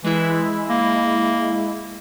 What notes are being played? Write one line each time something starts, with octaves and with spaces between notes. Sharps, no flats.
E3 G#3 E4
A#3